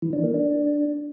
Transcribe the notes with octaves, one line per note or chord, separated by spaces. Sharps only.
E3
D4
A#3
D4